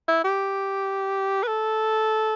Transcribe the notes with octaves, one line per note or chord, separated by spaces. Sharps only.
E4
G4
B4
A4